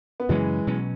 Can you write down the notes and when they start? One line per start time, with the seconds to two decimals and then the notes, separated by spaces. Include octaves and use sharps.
0.20 B3
0.29 F#2 C#3 E3 F#3 G#3 C#4
0.67 B2 F#3 C#4